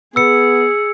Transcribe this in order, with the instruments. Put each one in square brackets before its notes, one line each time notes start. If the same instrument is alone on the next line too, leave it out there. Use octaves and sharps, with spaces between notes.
[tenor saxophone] B3 [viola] G#4 [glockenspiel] E6 C#7